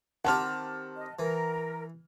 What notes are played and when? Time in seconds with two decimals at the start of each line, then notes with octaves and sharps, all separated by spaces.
0.25 D#3 C4 G4 F#5 A5 F6
0.96 D#5
1.19 E3 A#4